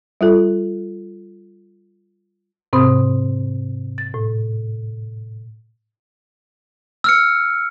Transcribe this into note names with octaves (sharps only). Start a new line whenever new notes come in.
G3 F4 A4
G#2 C3 C4 B5 D#6
A6
A2
E6 F6 C#7